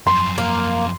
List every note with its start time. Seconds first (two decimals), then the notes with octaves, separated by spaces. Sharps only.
0.07 F#2 F3 C6
0.38 A#3